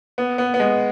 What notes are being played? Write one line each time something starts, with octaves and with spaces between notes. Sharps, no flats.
B3
B3
B3
G#3